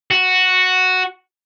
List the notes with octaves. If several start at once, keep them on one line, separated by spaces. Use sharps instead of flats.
F#4